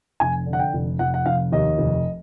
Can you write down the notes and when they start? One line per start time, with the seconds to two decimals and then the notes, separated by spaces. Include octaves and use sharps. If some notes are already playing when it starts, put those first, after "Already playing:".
0.20 F1 G#5
0.46 D3
0.53 F#5
0.59 G5
0.73 F1
0.99 F1 F#5
1.14 F#5
1.26 F1 F5
1.52 D#2 D#5
1.78 F1